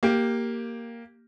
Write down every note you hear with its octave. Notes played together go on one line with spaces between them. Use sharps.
A#3 G4